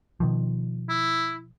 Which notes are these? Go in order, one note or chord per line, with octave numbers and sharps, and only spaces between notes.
B2 D#3 F3
E4